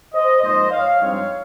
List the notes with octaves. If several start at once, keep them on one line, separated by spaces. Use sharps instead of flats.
C5 D#5
G#2 F3 A#3 C5 D#5
C#5 F5
G2 F3 G#3 C4 D#4 C#5 F5